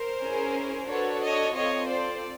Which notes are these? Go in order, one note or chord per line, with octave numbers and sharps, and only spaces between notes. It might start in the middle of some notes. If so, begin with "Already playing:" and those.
Already playing: A#4 C5
C#4 E4 G#4
D4 F#4 A4 B4 C#5
C#5 D#5
C4 F4 A4 C#5 D#5
C5 D5